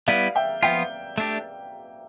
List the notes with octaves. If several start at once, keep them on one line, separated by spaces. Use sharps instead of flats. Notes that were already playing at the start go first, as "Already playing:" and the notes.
G3 B3 E4 B4 D5 F5
E5 G5
F3 B3 F4 E5 G5
A3 D4 G4